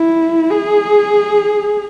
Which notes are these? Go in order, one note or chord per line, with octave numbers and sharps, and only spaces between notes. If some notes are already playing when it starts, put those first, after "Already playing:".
Already playing: E4
G#4